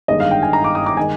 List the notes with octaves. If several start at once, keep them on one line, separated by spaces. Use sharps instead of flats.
G1 G2 D#3 G#3 D#5
F5
G5
G#5
A#5
D6
D#6
D6
D#3 G#3 D#4 G#5